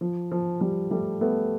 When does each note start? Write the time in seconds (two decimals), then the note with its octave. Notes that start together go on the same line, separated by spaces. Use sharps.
0.01 F3
0.31 F3
0.61 F3 G3
0.91 G3 A3
1.21 A3 B3